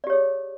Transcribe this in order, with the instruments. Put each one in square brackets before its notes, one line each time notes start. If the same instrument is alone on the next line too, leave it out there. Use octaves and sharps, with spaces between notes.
[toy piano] D5
G4
C#5
G#4